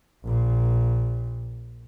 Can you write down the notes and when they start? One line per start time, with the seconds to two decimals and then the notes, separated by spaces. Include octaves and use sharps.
0.24 A#1 A#2